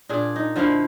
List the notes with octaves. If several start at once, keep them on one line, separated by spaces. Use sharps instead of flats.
A#2 D4 G#4
D#4
D3 F3 E4 F5